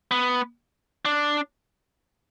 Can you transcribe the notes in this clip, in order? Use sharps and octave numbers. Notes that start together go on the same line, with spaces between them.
B3
D4